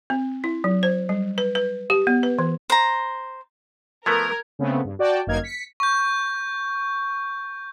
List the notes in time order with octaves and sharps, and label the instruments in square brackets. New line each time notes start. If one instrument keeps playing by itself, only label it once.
[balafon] C4
E4
F#3
C5
G3
B4
B4
G4
B3
B4
E3
[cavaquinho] C5 A#5
[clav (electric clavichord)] F3 A3 B3 [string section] A#4 [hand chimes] G#6
[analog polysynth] C#3 A3 B3 C4
G2
F#4 D5 G5 A5
G1 F#2 A#3 D#4 F6 G#6
B6 C#7
[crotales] C#6 G6